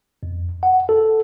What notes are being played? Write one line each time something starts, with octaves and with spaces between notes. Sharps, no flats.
F2
F#5
A4